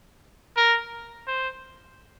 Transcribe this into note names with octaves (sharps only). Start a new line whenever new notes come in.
A#4
C5